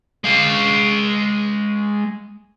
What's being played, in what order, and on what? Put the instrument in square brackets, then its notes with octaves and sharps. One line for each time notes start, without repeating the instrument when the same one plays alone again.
[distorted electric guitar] G#3 F5